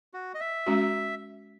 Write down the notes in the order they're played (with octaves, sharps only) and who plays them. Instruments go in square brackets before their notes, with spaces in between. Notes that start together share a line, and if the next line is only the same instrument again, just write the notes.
[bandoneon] F#4
D#5
E5
[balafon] G#3 C#4 F#4